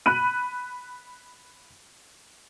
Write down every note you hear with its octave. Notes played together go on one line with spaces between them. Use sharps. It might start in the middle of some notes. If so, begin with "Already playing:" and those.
B5 F#6 D#7